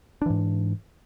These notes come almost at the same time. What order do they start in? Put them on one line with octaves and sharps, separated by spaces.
D4 E3 G#2